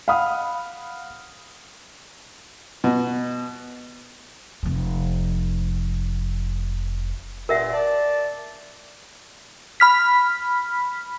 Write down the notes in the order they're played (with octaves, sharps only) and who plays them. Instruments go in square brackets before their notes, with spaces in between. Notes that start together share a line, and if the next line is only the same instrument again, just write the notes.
[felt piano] F5 F#5 B5 D#6 F6
[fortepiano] B2
[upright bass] F1 F3
[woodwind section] G2 A#2 [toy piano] A#4 E5 F#5
[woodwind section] D5 A5
[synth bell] B5 F6 B6